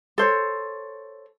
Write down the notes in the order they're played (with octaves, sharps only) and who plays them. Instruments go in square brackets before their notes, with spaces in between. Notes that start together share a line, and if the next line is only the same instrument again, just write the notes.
[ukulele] A4 C5 C#5